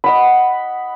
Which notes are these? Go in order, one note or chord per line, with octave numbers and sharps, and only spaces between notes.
D#5 F#5 B5